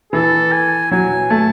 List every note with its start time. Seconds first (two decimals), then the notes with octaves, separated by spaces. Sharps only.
0.12 E3 A4
0.52 G#5
0.91 F#3 G#5
1.30 A3 A5